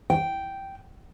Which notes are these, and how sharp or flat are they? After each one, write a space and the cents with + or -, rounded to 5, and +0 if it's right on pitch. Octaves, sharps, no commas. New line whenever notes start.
G5 -5